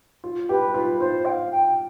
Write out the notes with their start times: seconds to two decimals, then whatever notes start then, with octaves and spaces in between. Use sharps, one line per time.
0.24 F4
0.49 G4 B4
0.74 F4 B4
1.00 F4 C5
1.25 G5
1.29 F5
1.51 G5